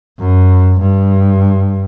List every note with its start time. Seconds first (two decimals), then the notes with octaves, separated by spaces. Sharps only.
0.19 F#2
0.81 G2